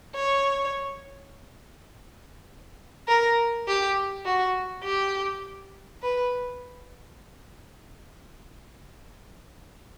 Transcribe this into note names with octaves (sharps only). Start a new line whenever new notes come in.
C#5
A#4
G4
F#4
G4
B4